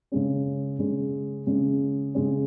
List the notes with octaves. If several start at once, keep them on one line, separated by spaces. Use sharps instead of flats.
C#3 G#3 C#4
C#3 G#3 C#4
C#3 G#3 C#4
C#3 G#3 C#4